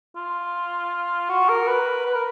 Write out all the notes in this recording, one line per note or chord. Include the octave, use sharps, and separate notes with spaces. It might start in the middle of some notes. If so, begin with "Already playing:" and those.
F4
F#4
A#4
B4
B4
A#4